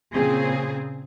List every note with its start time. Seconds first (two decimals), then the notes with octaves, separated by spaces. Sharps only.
0.14 A#2 C#3 C4 G#4